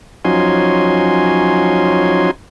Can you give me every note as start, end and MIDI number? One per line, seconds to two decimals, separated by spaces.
0.25 2.31 53
0.25 2.31 54
0.25 2.31 61
0.25 2.31 63
0.25 2.31 80
0.25 2.31 84